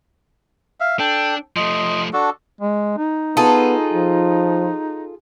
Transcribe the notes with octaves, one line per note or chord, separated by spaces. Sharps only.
E5 F5
D4 A4 G5
F3 A3 D#5 C6
D4 F#4 A4
G#3
D#4
B3 F4 G#4 A4
F3